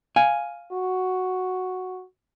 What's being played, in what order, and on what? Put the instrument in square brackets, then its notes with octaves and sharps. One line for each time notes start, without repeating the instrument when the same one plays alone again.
[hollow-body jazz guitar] F5 G#5
[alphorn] F#4